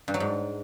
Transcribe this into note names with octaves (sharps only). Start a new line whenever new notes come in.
G2
F#3
G#2